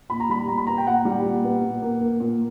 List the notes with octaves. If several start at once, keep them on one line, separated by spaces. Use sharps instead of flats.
A#2 B5
A#5
G3 B5
A#2 A#5
B5
B3 A#5
G5
A#2 F#5
G3
A#2
B3
A#2
A#3
A#3
A#2